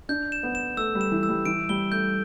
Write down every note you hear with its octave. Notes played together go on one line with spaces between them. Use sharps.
D4 G6
E7
B3
E7
A3 E6
G3
E7
E3
E6
G3
E3 D7
G3 G7
A3 G6